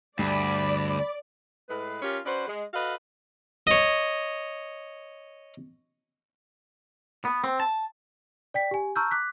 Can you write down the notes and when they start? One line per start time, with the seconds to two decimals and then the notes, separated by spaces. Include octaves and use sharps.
0.19 D2 G2 D5 B5
1.69 A2 G#3 B4
2.02 C#4 F4 G4 A#4 C#5
2.26 C#4 F#4 B4 C5 D5
2.47 G#3
2.74 F#4 A4 B4 D#5 F5
3.67 C#5 D#5
7.25 B3
7.44 C4
7.60 A5
8.54 D5 G5 B6
8.71 G4 G#5
8.96 A5 A#5 C#6 E6 F6 G6
9.11 D6 F#6 B6